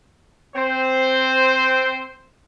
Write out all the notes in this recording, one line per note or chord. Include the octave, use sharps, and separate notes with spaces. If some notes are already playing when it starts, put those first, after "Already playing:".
C4 C5